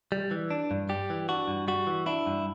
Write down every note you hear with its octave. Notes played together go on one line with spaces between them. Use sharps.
G3
E3
D4
G2
G3 G4
E3
D4 F#4
G2
G3 F#4
E3
D4 E4
G2